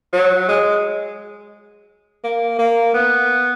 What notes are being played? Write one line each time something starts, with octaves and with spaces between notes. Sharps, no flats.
F#3
G#3
A#3
A#3
B3